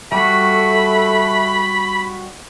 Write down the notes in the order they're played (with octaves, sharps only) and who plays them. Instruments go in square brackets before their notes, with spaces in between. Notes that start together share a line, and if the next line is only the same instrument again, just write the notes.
[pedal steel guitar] G3 F#4 [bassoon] A3 [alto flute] A4 [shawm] B5